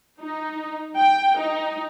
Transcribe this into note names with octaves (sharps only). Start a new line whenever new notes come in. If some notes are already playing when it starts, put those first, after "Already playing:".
D#4
G5
D#4